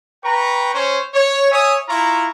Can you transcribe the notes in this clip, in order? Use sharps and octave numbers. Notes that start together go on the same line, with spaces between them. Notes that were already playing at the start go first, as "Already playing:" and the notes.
B4 G5 A#5 C#6
C#4 C5 C#5
C#5
C#5 E5 G#5 D#6
E4 F4 A#5 C#6